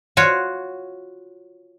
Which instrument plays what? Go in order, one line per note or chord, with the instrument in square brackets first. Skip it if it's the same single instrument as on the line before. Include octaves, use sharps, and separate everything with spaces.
[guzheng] F4 F#4 C#5